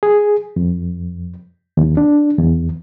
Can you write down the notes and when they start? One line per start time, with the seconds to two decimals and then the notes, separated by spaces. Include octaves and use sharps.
0.03 G#4
0.56 F2
1.77 D#2
1.97 D4
2.38 E2